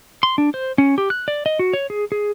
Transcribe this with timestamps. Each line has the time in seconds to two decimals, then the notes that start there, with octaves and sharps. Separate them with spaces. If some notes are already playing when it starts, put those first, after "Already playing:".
0.23 C6
0.38 D4
0.54 C5
0.78 C#4
0.98 G4
1.10 F#6
1.28 D5
1.46 D#5
1.59 F#4
1.73 C#5
1.90 G#4
2.12 G#4